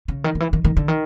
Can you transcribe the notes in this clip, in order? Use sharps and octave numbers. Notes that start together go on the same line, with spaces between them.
C#3
D#3
D#3
E3
D#3
D#3
D3
D#3